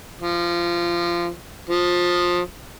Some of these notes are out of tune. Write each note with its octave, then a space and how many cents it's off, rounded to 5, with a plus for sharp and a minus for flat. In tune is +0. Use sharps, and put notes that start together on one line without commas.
F3 -20
F3 +20